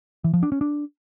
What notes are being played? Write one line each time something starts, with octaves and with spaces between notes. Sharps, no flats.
E3
F3
D4
C#4
D4